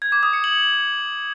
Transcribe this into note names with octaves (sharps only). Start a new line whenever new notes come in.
G#6
D6
D#6
C#7
F#7